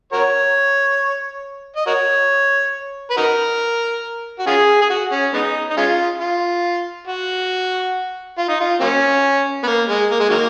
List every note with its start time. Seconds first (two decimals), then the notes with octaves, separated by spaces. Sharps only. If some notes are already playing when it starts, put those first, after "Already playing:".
0.13 F#4 A#4 C#5
1.76 D#5
1.87 F#4 A#4 C#5
3.11 B4
3.17 D#4 F#4 A#4
4.39 F#4
4.47 C#4 F4 G#4
4.82 G#4
4.90 F#4
5.12 C#4
5.33 G#3 B3 D#4
5.70 D#4
5.77 G#3 C#4 F4
6.20 F4
7.07 F#4
8.38 F4
8.49 D#4
8.60 F4
8.81 F#3 A#3 C#4
9.63 B3
9.67 A#3
9.89 G#3
10.11 A#3
10.20 G#3
10.30 D#3 F#3 A#3